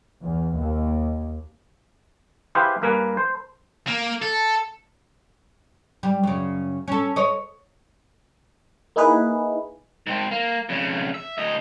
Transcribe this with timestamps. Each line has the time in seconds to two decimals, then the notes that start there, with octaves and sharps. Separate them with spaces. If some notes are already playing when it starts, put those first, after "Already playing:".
0.22 E2
0.54 D#2
2.55 E4 G4 G#4 B4 C5 F5
2.82 G2 A#3 A#4 B4 G#5
3.17 C5
3.87 A#3
4.22 A4
6.03 G3
6.23 F#2 C#3
6.88 C#4 A4
7.16 C#5 D#5
8.96 A#3 D#4 E4 G#4 B4
10.07 G#2 C4
10.31 A#3
10.69 F2 C#3
11.14 E5
11.38 D2 D#5